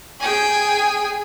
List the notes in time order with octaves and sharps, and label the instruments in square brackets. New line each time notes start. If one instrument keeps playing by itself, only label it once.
[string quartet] G#4 G5 G#5